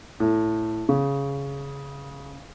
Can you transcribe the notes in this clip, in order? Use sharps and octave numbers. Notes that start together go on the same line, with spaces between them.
A2
C#3